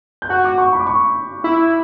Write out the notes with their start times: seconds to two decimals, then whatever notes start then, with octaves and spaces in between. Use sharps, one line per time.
0.22 G6
0.29 F#4 F#6
0.44 D6
0.58 C#6
0.73 B5
0.80 D6
0.87 C#6
1.44 E4